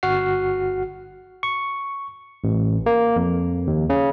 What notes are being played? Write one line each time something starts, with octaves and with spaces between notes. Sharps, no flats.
G1 F#4 F#5 F6 C7
C#6
A1
A#3
F2
D#2
C#3